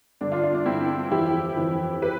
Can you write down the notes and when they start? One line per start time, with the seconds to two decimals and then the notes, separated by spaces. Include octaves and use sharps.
0.21 G2 D3 D4
0.32 D4 F4
0.43 D4 F4
0.54 D4
0.65 G2 D3 C4 E4
1.11 F2 E3 E4 G4
1.57 F2 E3
2.02 G4 B4